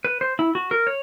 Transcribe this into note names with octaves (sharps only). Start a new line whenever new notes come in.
B4
C5
E4
F#4
A#4
C#5